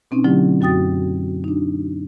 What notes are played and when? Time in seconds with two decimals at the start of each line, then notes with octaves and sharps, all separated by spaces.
0.11 B2 C4 C#4 D#4
0.24 B2 D3 F#3 A3 E4 G4
0.61 F#2 F#4 G5 D#6 A6
1.44 D4 D#4